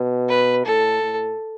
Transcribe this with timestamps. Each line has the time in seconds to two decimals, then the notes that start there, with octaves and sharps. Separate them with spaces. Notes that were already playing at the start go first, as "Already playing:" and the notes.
Already playing: B2
0.29 B4
0.65 A2 A4
1.02 A2